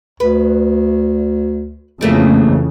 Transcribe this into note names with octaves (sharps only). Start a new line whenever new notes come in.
D2 B4
F2 C#3 E3 G3 A3 A#3